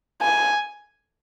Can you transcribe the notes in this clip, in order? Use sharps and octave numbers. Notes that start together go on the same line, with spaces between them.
G#5